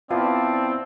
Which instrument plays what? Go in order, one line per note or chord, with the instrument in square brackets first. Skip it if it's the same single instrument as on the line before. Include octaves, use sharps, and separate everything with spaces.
[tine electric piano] B3 E4 [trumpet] C4 [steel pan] F4 [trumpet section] D5 A5